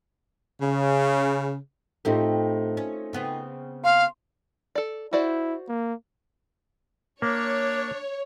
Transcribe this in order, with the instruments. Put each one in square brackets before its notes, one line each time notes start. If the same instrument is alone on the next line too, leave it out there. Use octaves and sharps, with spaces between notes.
[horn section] C#3
[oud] A2 C4 G4 [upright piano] A3 D#4 F4
[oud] C#4
C#3 B3 C4
[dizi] F5 [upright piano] C6
[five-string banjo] A4 D5
[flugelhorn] E4 [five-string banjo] F#4 C5 D5
[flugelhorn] A#3
[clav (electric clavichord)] A#3 [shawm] D4 [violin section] C#5